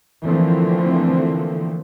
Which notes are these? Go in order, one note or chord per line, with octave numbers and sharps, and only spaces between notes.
D3 E3 F3 A3 A#3 C4